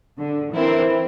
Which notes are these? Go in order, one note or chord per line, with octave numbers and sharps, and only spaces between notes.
D3
E3 C4 E4 A#4